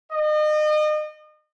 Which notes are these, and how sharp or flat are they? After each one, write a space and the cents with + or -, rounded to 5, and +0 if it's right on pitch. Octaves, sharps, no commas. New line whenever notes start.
D#5 -35